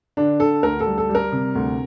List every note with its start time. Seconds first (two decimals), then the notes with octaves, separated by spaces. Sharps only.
0.17 D3 D4
0.40 D3 A4
0.63 D2 A#4
0.80 A4
0.86 G3
0.98 A4
1.09 G3
1.15 A#4
1.32 C3
1.55 D2